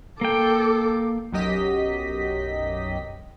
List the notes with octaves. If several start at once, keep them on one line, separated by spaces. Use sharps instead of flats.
A#3 A4 G5 D6
B1 F#2 F#3 G4 D#5 B6